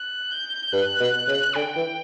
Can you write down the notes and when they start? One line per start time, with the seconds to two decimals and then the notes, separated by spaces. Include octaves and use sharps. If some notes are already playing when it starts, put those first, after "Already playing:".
Already playing: F#6
0.31 G6
0.72 G2 F#6
1.00 B2
1.27 C#3
1.55 D3 G5
1.76 E3